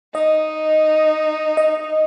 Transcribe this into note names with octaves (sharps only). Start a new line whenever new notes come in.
D#4 D#5
D#5